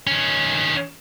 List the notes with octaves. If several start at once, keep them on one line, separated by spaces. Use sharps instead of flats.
D#3 C#4